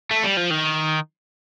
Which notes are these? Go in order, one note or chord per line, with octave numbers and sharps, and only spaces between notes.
A3
G3
F3
D#3